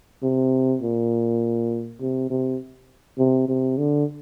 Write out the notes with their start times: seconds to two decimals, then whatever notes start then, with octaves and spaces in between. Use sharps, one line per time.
0.23 C3
0.82 A#2
2.01 C3
2.30 C3
3.18 C3
3.48 C3
3.78 D3